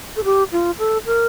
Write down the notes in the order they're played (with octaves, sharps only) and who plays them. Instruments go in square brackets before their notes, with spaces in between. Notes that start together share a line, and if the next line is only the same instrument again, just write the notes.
[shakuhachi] A4
G4
F4
A4
A#4